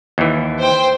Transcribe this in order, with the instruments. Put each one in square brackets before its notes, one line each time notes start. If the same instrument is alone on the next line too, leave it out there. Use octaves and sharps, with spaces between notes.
[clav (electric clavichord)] D#2 E3
[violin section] C5 G5